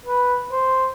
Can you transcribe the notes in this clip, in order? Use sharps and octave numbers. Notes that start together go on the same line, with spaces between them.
B4
C5